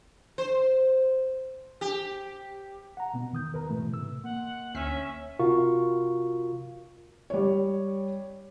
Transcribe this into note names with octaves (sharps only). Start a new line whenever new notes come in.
C5
G4
F#5 A#5
B2 B3
E2 D#3 D#6 G6
A#4 B4 A#5
G#2 B2 E3 A3
A2 C3 E6
A#3 F#5
D2 C#4 E5 F6 B6
C3 F4 F#4 A#4 F5 C#6
G3 C#5